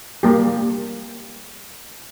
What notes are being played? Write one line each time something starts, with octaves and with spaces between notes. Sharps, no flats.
G3 A#3 G4